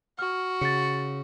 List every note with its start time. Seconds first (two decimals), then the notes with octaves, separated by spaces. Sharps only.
0.19 F#4 F6
0.61 C#3 A6 C#7